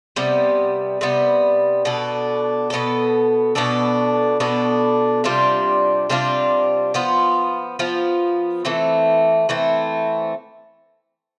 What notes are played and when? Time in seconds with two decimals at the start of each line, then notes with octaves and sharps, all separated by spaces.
0.16 C3 G3 B3
1.01 C3 G3 B3
1.85 B2 B3 D4 A4
2.70 B2 B3 D4 A4
3.55 B2 B3 D4 A4
4.40 B2 B3 D4 A4
5.24 C3 G3 D4 F4
6.10 C3 G3 D4 F4
6.94 F3 B3 F4
7.79 F3 B3 F4
8.65 E3 A3 C4
9.49 E3 A3 C4